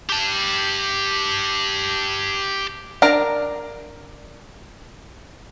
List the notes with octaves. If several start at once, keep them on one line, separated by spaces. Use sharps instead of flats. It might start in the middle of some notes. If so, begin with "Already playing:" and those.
G4 A5
D4 A#4 A#5